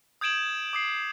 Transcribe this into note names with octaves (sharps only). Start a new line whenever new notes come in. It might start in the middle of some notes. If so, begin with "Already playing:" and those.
D#6 G6 G#6 D7 E7 F#7
D6 D#6 C7